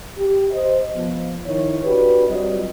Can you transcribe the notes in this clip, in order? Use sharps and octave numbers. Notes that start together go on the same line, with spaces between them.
G4
C5 D#5
F3 B3
D#3 E4 C#5
D4 F#4 G4 B4
F#3 G3 C4 F4 D#5